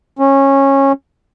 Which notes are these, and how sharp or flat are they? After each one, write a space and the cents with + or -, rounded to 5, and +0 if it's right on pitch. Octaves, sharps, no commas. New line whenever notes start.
C#4 -20